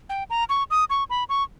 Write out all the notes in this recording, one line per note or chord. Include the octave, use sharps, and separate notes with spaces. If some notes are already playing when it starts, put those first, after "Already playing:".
G5
A#5
C#6
D#6
C#6
B5
C#6